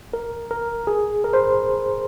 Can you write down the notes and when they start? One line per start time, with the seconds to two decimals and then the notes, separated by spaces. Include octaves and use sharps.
0.13 A#4
0.51 A#4
0.87 G#4
1.24 A#4
1.33 C5